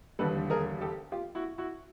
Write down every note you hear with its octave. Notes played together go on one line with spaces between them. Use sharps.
E1 D#2 D3 G3 A4 B4
G#4 A#4
G4 A4
F4 G4
E4 F#4
E4 F#4